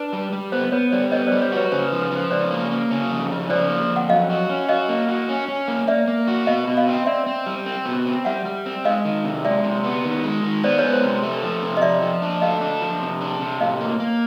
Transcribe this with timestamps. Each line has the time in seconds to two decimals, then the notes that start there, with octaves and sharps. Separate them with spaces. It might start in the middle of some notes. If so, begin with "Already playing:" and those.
Already playing: D4 B4
0.13 G3
0.32 G3
0.52 B3 C5
0.72 B3 B4 C#5
0.92 G3 C5 D5
1.12 B3 C#5 D#5
1.27 G3 C5 D5
1.42 B4 C#5
1.52 F#4 B4 C#5
1.72 C#3 C5
1.87 F3 B4
2.02 B4
2.12 F3 C5
2.31 C#3 C5 D5
2.51 A#3
2.71 A#3
2.91 C#3
3.10 F2
3.30 C#3
3.50 F3 C5 D5
3.69 A#3
3.90 F2
3.97 F#5
4.10 F#3 D#5 F5
4.30 F#4
4.50 C#4
4.69 F#4 D#5 F5
4.89 A#3
5.08 F#4
5.29 C#4
5.48 C#4
5.68 A#3
5.87 A#3 D5 E5
6.08 A#3
6.28 F#4
6.47 B2 D#5 F5
6.67 B2
6.77 D#5 F5
6.87 C4
7.06 C4 D5 E5
7.26 C4
7.46 G3
7.66 C4
7.85 B2
8.06 C4
8.25 G3 E5 F#5
8.45 G3
8.66 C4
8.85 G#3 D#5 F5
9.05 D#3
9.24 C3
9.45 G#3 D5 E5
9.64 C3
9.84 B3
10.04 D#3
10.24 G#3
10.44 D#3
10.64 B3 C5 D5
10.79 G#3 B4 C#5
10.93 C5
11.03 C3
11.23 A3
11.42 F3
11.62 C3
11.77 D#5
11.82 F3 D5 E5
12.02 F3
12.22 D4
12.41 A3 D#5 F5
12.61 D4
12.81 F3
13.02 C3
13.21 D4
13.41 C3
13.60 A2 D#5 F5
13.81 A#3
14.00 A#3